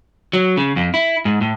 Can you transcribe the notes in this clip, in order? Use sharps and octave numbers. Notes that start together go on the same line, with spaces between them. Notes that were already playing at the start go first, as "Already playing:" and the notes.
F#3
C#3
F2
E4
G#2
A2